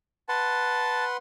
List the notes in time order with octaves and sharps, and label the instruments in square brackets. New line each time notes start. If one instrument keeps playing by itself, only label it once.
[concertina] B4 F#5 C6 [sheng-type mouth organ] A5